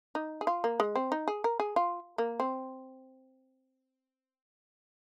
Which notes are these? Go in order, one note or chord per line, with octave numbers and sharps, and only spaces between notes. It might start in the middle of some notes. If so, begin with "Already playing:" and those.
D#4
G#4
F4
A#3
G#3
C4
D#4
G#4
A#4
G#4
F4
A#3
C4